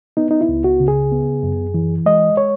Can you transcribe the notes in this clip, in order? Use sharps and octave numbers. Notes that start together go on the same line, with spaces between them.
B3 D#4
D#4
E4
C#2
F#4
C#3
G#4
B3
F#2
E3
G#3 D#5
C#5